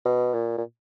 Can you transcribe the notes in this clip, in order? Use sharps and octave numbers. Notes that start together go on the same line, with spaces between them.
B2
A#2
A#2